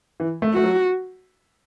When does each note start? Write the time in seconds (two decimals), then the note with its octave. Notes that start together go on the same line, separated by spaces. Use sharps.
0.20 E3
0.42 A3
0.53 A3 F#4
0.64 F#3